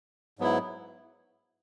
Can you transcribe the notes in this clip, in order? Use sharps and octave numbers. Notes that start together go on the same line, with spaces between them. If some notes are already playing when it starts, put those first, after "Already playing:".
G#2 F#3 B3 E4